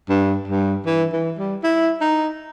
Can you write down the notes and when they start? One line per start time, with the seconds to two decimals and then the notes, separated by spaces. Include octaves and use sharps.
0.09 G2
0.48 G2
0.86 E3
1.12 E3
1.38 G3
1.63 E4
2.01 D#4